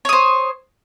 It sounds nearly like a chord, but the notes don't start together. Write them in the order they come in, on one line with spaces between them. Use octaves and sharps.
C#5 D#6 C5